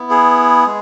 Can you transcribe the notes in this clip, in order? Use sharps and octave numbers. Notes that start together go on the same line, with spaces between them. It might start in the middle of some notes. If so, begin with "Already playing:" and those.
Already playing: B3 E4
G#4
G#3